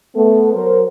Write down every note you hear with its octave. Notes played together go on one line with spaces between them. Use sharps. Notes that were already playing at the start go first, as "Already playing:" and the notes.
A3 B3 A4
F#3 A#4 C5